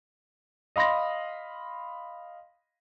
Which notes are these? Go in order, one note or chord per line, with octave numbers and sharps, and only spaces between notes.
D#5 F5 B5 C6 A#6